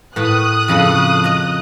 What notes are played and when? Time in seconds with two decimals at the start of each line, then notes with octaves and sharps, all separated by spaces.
0.16 A2 B4 D#6 F#6
0.68 F2 C#3 A4
1.24 D#5 A#5